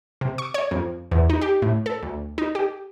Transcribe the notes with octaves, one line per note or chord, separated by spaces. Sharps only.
C3
C#6
C#5
F2
E2
D#4
G4
A2
A4
D2
D#4
G4